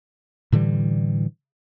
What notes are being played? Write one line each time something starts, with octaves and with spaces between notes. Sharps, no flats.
A2 D3 E3 G3